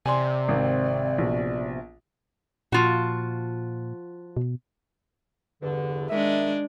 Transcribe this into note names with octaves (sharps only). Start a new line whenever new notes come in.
C3 D5 G#5 C6
G#1 C4
A#1 B2
A#2 F3 F4 F#4
B2
E2 G2 D3
D#3 G#3 D4 E5